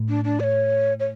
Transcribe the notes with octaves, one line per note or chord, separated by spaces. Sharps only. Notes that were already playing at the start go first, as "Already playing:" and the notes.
Already playing: A2
D4
D4
D5
C#5
C#5